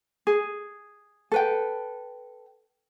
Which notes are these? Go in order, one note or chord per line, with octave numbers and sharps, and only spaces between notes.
G#4
A4 B4 G5